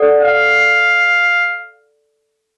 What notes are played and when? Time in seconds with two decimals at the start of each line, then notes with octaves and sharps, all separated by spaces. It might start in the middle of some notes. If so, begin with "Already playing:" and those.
Already playing: A4 D5 F#5
0.22 F5